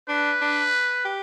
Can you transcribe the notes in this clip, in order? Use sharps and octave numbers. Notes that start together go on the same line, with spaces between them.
D4 B4
D4
G4